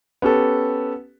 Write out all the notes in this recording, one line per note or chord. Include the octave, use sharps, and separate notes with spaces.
B3 C#4 G4 A4